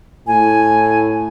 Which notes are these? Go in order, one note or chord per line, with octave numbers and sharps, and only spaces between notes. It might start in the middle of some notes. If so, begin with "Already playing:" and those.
A2 G#5